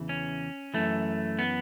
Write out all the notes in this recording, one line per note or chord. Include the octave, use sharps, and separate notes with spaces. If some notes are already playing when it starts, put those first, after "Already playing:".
Already playing: E2 C#3 E3
C#4
F#2 E3 A3
B3